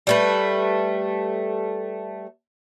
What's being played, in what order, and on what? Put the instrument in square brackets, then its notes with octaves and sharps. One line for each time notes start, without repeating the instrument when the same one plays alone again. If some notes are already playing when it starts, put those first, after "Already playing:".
[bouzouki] G3 A3 B4